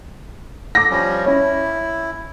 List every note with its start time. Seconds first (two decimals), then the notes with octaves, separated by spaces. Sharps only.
0.75 A4 D6 A#6
0.90 F3 G3 C#4
1.26 C#4 E4